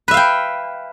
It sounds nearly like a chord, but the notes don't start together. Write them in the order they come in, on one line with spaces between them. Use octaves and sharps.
B4 E5 F5 G5